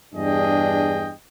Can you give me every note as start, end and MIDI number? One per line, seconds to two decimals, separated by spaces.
0.15 1.12 40
0.15 1.12 43
0.15 1.12 62
0.15 1.12 68
0.15 1.12 75
0.15 1.12 79